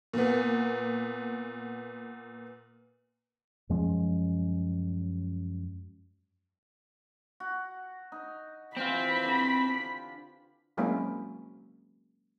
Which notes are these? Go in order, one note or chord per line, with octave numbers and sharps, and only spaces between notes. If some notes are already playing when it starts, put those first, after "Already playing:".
A#2 B3
F#2 F3 G#3 C#4
F#4
D#4
C3 E3 C4 F4 B5
D3 G4
F#3 G#3 A#3 C4 C#4 E4